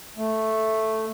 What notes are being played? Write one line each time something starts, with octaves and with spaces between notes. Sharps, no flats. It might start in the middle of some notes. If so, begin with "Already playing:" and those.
A3